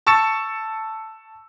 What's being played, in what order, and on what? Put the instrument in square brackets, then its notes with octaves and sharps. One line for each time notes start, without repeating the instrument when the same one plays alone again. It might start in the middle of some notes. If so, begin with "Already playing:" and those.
[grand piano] A5 C#6 E6 A6 C#7 E7